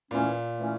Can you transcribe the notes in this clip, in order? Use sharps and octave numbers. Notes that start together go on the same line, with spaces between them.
A#2 E3 A3 C#4
E3 A3 C#4